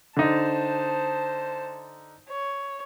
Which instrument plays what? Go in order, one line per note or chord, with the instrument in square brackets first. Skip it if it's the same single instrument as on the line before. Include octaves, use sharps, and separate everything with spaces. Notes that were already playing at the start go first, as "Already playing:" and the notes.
[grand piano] D3 D#4 [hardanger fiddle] C5 A5
[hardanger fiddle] C#5